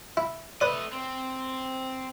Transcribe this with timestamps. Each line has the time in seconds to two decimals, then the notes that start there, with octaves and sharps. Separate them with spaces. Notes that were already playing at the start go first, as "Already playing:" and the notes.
0.17 E4
0.61 A3 B4 D5 D#5
0.92 C4